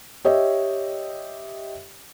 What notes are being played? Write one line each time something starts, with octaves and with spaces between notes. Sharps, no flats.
G4 C#5 D#5 E5